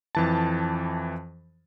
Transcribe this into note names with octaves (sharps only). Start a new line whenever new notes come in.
F2 E3 A5